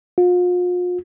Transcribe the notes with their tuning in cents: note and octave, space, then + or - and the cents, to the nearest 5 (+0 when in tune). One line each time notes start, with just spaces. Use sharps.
F4 +40